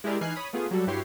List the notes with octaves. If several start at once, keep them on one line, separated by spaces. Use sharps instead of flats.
G#3 E4 G4 G#4 A#4 D5
E3 D#4 G#5 F6 F#6 C7
C#5 B5 D#6
A3 B3 F4 G#4
F#3 G3 F#4 A4
G2 E4 F#4 G4 C#5 C6